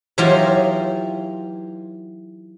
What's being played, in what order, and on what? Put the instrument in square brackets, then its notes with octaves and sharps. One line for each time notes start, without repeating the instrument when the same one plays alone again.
[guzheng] E3 F#3 D#4 F4 G4